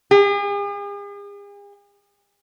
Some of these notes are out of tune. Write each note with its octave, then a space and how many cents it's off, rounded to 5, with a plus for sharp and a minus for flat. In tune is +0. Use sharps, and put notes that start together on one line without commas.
G#4 -45